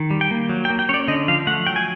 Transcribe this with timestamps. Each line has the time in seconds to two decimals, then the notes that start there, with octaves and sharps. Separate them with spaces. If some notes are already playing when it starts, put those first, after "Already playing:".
Already playing: D#3
0.11 G3
0.21 G5
0.31 A#3
0.49 F#3
0.65 G5
0.70 A#3
0.79 G5
0.89 C#4 C#5 D5
1.08 D3 D#5
1.28 F3 F5
1.47 A3 F#5
1.67 F#3 G5
1.76 G#5